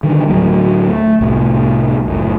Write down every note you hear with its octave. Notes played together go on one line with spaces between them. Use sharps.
D3 D#3 G3
D2 A2 F#3 A#3
A3
C2 A2
F#1 C#2 A2